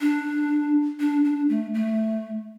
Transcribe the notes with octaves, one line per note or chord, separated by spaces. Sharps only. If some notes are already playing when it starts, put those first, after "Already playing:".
D4
D4
D4
A3
A3